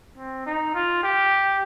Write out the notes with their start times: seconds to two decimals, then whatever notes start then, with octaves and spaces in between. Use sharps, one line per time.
0.17 C4
0.46 D#4
0.74 F4
1.03 G4